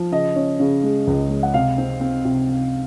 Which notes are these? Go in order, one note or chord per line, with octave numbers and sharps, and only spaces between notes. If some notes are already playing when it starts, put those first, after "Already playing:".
Already playing: F3
C#3 D#5
C#4
C#3
G#3
C#2
G#3
F#5
C3 F5
C4
C4
C3
C3